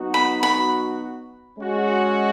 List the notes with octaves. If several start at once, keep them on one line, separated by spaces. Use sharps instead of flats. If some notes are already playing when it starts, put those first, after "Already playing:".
Already playing: F#3 B3 D#4 F#4
B5
B5
G#3 C#4 F#4